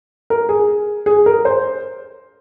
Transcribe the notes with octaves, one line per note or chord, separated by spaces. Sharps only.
A#4
G#4
G#4
A#4
C5